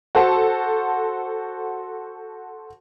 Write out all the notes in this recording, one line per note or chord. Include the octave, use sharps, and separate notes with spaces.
F#4 A4 C5 A5